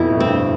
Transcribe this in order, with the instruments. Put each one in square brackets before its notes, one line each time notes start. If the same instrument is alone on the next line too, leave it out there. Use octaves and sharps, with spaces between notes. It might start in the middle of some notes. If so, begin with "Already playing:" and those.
Already playing: [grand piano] F2 [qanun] B2 E4
[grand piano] A2
[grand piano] G2 [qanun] C4